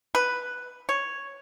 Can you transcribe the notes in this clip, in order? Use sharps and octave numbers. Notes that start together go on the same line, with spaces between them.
B4
C#5